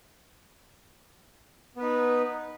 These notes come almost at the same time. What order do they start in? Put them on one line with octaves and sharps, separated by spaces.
B3 B4 D#4